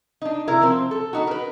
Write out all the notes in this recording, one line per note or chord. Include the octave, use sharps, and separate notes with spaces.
D4 D#4
C3 E4 A#4
F3 C4
A4
B3 D#4 F#4
A#4 B4